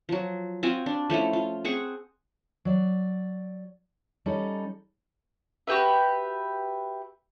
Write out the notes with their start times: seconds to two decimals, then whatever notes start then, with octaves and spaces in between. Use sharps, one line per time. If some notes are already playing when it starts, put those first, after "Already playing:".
0.09 F3 F#3
0.63 C4 F4 F#4 G#5
0.86 D4
1.10 F3 A3 C#4 E4
1.33 F4
1.65 C4 G#4 F#5 C#6
2.65 F#3 D5
4.26 G3 C#4 D#4 A4
5.67 F#4 G4 B4 E5